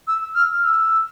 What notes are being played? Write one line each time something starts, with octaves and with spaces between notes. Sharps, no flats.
E6
F6
E6